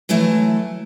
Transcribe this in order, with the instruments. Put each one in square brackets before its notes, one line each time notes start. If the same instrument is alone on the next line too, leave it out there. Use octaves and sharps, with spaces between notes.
[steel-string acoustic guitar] E3 F#3 A3 E4